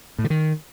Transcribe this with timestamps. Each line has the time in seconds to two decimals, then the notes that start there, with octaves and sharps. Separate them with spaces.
0.19 A2
0.24 D3
0.30 D#3